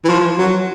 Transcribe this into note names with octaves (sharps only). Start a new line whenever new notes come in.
E3
F3
F#3